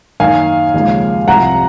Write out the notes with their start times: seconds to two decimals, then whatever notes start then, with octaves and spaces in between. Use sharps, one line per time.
0.20 F#2 D#3 A#3 F5 G#5
0.74 D#2 C#3 F3 G#3
1.28 C2 C3 F3 F#5 A#5